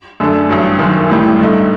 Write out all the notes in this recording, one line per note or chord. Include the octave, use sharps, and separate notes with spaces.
F#2 D3 A3 D4 A4
A1 G2 F#3
F#1 F#2 D#3
A1 A2 G3
G2 D3 A3 D#4